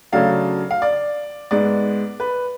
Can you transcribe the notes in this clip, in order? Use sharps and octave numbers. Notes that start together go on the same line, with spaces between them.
C#3 F#3 A3 D4 F5
F5
D5
G#2 G#3 B3 D5
B4